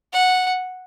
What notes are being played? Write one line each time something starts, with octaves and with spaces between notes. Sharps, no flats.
F#5